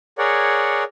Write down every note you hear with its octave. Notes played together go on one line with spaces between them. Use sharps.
G#4 A#4 C#5 D5 F#5